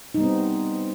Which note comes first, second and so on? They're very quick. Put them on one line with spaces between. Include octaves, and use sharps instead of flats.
D#4 G3 B3 C4